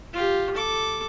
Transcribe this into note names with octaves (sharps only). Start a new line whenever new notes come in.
F4 G4
A4 D6